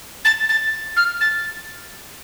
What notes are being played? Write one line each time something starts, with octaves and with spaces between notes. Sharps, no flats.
A6
A6
F6
A6